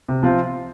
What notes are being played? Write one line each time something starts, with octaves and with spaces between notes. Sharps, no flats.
C3
F3 C4 F4